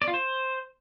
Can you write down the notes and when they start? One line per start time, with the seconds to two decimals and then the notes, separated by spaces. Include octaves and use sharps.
0.02 D5
0.08 F4
0.14 C5